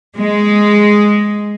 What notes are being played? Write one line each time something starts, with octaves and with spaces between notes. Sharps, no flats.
G#3